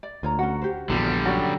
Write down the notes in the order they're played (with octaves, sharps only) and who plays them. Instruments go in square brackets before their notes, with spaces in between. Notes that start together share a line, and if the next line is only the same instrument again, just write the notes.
[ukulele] D5
[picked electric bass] D2 [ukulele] F4 C#5 A#5
[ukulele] C#4 F#5 [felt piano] F#4
[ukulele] G4 C5
[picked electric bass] A#1 [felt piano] E2 [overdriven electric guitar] D3 G3 [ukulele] F#4
[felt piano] F#3 F#4 A6 [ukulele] C#4 D5 G5